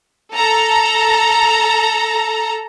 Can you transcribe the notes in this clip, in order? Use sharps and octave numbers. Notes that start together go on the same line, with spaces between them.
A4 A#5